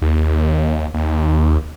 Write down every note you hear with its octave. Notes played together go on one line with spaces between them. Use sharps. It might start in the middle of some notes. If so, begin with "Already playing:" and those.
D#2
D#2